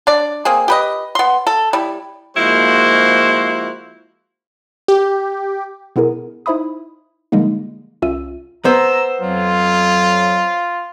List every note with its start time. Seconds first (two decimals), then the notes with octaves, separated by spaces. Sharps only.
0.07 D4 D5
0.45 A#3 C4 G#4
0.68 G4 B4 D#5
1.15 B3 C6
1.47 A4
1.73 G3 E4
2.37 F3 G#3 A#3 E4 F#4 C5
4.88 G4
5.96 B2 B3 E4 G#4 A#4 D#7
6.46 D#4 E4 C5 E5 B5 D#6
7.32 D3 F3 G3 G#3 A#3 D#4
8.02 C2 C#4 F4 E5 E6 D#7
8.65 B3 C5 A#5 E6
9.20 F2 F#3 F4